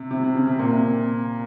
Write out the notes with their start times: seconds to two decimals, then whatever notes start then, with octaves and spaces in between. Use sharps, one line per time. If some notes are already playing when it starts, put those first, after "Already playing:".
Already playing: C3
0.11 C3
0.24 C3
0.35 C#3
0.47 C3
0.59 A#2
0.71 C3
0.83 C3